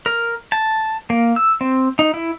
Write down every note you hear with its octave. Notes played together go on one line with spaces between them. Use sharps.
A#4
A5
A#3
E6
C4
D#4
E4